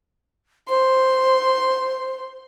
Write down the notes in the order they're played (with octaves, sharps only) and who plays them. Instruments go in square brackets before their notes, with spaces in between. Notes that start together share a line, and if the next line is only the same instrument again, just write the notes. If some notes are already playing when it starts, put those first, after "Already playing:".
[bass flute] C5 [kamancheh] C6